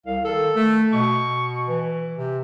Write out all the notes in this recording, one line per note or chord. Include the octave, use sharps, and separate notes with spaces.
C2 F5
D#3 A4
A3
B2 C#6
E3
C3